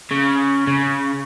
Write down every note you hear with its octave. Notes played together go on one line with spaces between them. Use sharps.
C#3
C#3